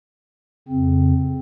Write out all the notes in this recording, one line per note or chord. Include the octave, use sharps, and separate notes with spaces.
F2 C#3 C4